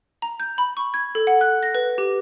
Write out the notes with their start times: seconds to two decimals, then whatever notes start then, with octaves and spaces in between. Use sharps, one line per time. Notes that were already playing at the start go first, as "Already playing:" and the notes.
0.22 A#5
0.40 G6
0.58 B5
0.77 C#6
0.94 G#6
1.15 A4
1.27 F#5
1.41 F#6
1.63 A#6
1.75 B4
1.98 G4